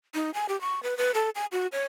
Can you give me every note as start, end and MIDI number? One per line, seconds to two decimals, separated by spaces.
0.15 0.31 63
0.34 0.46 80
0.49 0.59 67
0.61 0.82 85
0.83 0.97 71
0.98 1.12 71
1.14 1.30 69
1.35 1.46 80
1.52 1.67 66
1.72 1.86 73